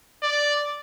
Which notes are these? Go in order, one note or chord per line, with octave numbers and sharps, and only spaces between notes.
D5